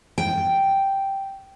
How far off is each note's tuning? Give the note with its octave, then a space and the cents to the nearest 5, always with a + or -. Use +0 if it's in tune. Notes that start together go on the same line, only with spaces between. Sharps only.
G5 -5